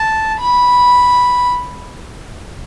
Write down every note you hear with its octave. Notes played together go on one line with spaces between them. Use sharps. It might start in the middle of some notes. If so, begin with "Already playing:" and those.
Already playing: A5
B5